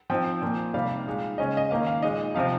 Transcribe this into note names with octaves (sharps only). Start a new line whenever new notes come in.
F3 C4 D#4 G5
A#2 F3 A#3
C3 G3 A#3 D#4 F5
A#2 G#3 D#4
C#3 G#3 C#4 D#5
D#5
D#3 A#3 C#4 F5
F5
A#2 G#3 D#4 D#5
C3 F3 C4 D#4 F5